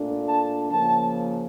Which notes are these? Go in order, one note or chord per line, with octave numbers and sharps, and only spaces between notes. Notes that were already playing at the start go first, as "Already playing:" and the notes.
Already playing: A#2 A3 D4
A5
C#3 F3 A#3 A5